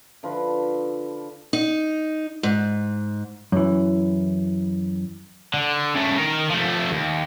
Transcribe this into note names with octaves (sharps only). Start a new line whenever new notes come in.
D3 F3 F4 B4
D#4
G#2
F#2 E3
D3
C#3 A3
D#3 A#4
F3 A3
D#2